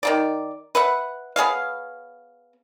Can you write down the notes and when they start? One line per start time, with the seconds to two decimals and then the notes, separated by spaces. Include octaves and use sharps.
0.03 D#3 A#3 D5
0.75 B4 E5 F#5
1.36 B3 G#4 C#5 F5